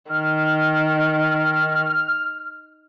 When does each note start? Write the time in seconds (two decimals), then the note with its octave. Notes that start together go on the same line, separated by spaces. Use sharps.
0.11 D#3 F6